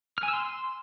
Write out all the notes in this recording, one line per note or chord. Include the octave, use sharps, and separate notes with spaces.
F6
G#5
E6
C6